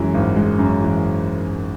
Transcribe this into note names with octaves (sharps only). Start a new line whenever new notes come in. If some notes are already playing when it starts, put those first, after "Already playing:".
Already playing: F#2 E3 G#3
G#1
G#3
F#2
E3